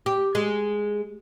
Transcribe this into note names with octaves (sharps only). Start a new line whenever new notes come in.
G4
G#3